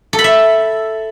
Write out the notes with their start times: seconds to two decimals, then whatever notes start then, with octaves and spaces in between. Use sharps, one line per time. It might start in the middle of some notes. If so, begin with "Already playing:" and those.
0.13 A4
0.19 B5
0.24 E5